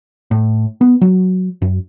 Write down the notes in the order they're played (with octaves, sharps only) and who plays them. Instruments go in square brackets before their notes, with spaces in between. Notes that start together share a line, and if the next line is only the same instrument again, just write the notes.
[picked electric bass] A2
B3
F#3
F#2